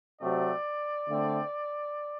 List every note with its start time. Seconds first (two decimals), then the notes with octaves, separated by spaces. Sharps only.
0.21 C3 F#3 A3 C4 D5
1.09 D3 A3 C4